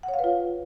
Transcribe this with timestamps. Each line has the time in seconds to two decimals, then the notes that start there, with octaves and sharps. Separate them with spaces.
0.03 F#5
0.08 C#5
0.14 F5
0.19 B4
0.24 F4